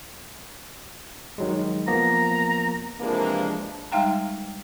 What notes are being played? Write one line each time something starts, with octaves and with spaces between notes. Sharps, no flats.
D#3 F#3 G#3
F3 A#3 B3 A#5
C3 E3 F3 G#3 A#3 D4
G3 G#3 D#4 F5 G5 A#5